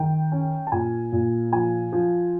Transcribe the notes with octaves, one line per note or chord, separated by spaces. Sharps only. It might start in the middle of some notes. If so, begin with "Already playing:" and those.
Already playing: D#3 G5
C#4
A5
A#2 G#5
A#2
F3 G#5
F3